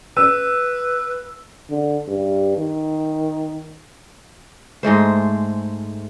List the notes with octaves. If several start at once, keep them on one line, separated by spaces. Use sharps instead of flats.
B4 E6
D3
G2
D#3
G#2 G#3 A3 C5